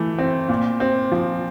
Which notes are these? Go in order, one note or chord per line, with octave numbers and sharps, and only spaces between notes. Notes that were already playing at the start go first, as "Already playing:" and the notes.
Already playing: E3 A3
C4
A#2
C4
F3